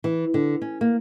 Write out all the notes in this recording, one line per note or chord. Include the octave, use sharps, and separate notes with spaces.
E3
D3
C#4
A#3